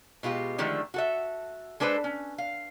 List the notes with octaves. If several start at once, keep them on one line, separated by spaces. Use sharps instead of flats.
B2 G#3 F4 G4
D3 D#3 F3 G#3 A3
F#4 A4 E5
G#3 D4 A4 B4 C5
C#4
F5